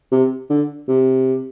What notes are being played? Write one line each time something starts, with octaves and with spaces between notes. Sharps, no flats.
C3
D3
C3